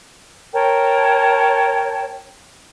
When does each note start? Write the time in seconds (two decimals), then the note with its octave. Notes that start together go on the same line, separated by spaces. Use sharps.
0.53 A#4 C#5 G5 A5